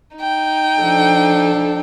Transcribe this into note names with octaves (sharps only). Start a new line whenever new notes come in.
D#4 G5
F3 D4 A4